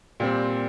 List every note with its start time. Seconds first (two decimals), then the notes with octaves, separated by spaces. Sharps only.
0.20 A#2 G3 C4 G4